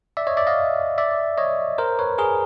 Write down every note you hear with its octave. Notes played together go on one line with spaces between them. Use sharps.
D5 E5
C#5 D#5
D5 E5
D#5 F5
D5 E5
C#5 D#5
A#4 C5
B4 C#5
G#4 A#4